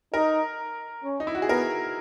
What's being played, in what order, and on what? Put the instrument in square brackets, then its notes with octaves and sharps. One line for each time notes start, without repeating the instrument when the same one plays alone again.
[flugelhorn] D#4 [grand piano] A#4
[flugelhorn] C#4
[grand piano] D#4
E4
F#4
G#4
[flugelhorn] B3 [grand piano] A#4